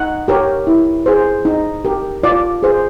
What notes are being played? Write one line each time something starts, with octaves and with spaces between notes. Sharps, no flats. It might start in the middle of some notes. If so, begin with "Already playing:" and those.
Already playing: D#4 F#5
G4 A#4 C#5
E4
G#4 C5
D#4
G4 A#4
F4 D5
G#4 C5